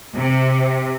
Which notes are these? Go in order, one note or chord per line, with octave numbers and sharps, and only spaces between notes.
C3